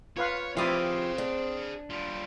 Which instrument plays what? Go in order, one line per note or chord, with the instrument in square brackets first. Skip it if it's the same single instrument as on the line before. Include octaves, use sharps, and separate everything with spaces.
[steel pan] F4 B4 F5 [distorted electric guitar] C#5
[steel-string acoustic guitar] F3 G4 [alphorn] C4 [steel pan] E4 D5 D#6 [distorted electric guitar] G#4 F5
[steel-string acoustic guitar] D4
[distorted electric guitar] G3 F4